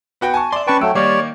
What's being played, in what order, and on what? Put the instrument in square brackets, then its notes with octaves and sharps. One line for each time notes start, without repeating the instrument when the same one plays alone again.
[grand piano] B3 F#4 G5
G#5 A5 C#6
[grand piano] D5 [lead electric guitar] E5 C6
[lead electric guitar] C#4 G5 [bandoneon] B4 A5 C#6
[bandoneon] F#3 A3 [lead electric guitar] G5 [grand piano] E6
[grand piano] D#3 A#3 [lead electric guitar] G3 [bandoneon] C#5 D5